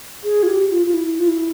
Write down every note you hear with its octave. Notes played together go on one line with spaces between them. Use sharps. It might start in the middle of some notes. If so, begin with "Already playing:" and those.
G#4
F4
G4
F4
F4
E4
F4
E4